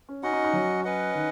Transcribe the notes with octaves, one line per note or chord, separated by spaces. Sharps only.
C#4
C#4 D#4 F#4 D#5 F#5
D#4
D#4
F#3
C#4 B4 D#5 F#5
D#3